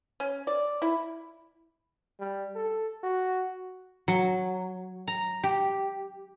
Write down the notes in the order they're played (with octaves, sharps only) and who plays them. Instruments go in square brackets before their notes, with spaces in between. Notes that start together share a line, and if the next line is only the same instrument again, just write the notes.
[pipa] C#4
D5
E4
[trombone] G3
A4
F#4
[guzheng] F#3
A#5
G4